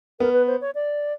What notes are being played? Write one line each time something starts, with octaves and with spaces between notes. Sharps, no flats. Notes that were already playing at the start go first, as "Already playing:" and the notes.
B3 A#4
B4
C5
C#5
D5